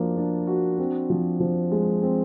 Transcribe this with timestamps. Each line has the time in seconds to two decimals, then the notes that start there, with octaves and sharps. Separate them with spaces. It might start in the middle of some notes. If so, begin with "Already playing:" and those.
Already playing: F3 A#3 D4 F#4
0.17 D4
0.47 F#4
0.78 C4
1.10 F3
1.40 F3
1.71 G#3
2.02 C4